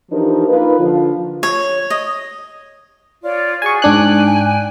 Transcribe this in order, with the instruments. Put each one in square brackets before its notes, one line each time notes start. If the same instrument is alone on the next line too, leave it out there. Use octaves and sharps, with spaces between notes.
[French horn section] E3 F3 D4 D#4 G4 A#4
A#3 D#4 F4 B4
D3 F3 F4
[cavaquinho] C#5
D#5
[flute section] F4 C#5 D5
[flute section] F#4 G#4 [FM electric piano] G#5 C#6
[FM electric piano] G#2 D4 F#6 [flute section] G5 G#5